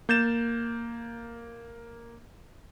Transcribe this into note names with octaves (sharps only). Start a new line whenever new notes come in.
A#3 G6 A6 E7